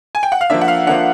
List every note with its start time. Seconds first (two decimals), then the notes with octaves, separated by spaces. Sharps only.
0.15 G#5
0.23 G5
0.32 F#5
0.41 F5
0.50 F3 A#3 D4 E5
0.61 F#5
0.68 F5
0.87 F3 A#3 D4 F#5